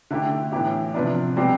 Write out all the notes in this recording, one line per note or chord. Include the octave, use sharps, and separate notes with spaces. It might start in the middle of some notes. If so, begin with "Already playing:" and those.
D3 A3 E4 G4
A2 E3 B3 E4 G4
C3 F3 B3 D4
B2 G3 C4 G4